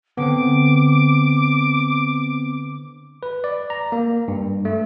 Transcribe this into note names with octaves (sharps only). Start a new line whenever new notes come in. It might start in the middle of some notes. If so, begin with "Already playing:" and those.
D3 B3 C4 D6
B4
D5
A#5
A#3
G2
A3